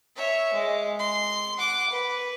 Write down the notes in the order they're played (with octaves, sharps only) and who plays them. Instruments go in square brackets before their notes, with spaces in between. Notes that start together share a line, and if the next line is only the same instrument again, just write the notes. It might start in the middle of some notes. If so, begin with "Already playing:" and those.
[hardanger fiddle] C#5 E5
G#3
C6
F#5 D6
B4